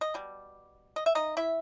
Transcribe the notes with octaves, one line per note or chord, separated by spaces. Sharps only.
D#5
B2 G3
D#5
E5
D#4 D#5
E4 E5